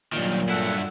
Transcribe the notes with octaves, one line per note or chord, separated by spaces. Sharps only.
G2 A#2 D#3 F#3
G2 E4 A4 F#5